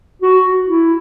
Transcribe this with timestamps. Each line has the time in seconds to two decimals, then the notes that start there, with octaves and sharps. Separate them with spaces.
0.22 F#4
0.68 E4